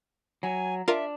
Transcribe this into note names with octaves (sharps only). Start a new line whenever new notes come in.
F#3 G#5
D4 F4 A#4 E5